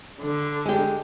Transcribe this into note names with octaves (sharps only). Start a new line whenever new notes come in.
D3
G#3 G4